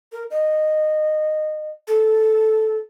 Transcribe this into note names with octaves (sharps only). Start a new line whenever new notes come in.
A#4
D#5
A4